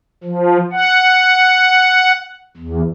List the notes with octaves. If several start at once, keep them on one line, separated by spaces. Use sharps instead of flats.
F3
F#5
E2